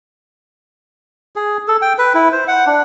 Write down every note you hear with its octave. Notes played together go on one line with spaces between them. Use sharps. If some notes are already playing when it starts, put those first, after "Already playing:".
G#4
A4
G5
B4
E4
C5
F#5
D4